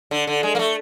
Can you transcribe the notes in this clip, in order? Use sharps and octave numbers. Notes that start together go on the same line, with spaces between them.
D3
D3
G#3
A#3
A3